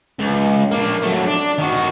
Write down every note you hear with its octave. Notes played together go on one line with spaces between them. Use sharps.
C#2
A#3 D4
F#3 A3
D4
D#3 F#4